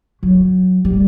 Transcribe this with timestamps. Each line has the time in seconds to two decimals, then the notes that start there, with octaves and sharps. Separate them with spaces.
0.23 F#3
0.85 G3